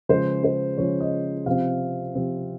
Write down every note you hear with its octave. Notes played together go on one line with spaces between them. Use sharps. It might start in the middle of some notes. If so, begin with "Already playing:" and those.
C#3 F3 G#3 C5
C5
C#3 F3 G#3 C#5
D#5
C3 F3 C4 F5
C3 F3 C4